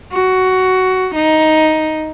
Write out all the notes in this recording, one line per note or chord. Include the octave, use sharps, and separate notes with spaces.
F#4
D#4